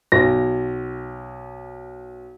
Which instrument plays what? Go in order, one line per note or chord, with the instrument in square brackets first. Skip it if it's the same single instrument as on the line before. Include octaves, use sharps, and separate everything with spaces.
[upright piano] B1 A#6